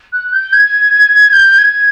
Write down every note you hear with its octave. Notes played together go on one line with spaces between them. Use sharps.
F#6
G6
G#6
G6
G#6